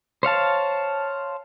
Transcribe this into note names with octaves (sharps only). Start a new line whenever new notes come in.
C5 C#5 F5 A5